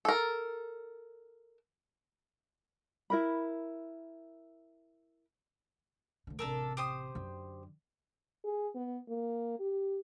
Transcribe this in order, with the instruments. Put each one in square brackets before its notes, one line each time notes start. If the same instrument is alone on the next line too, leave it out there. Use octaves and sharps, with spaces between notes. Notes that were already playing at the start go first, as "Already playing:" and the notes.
[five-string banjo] A4 A#4
[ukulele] E4 A#4 B5
[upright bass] D2 D3
[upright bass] A1 C3 [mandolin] D4 A4 A#4
[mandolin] G4 C5 D#6
[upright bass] F#2 D3
[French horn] G#4
B3
A#3
G4